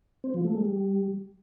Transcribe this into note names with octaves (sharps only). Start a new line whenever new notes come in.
C4
F3
A3
G#3
G3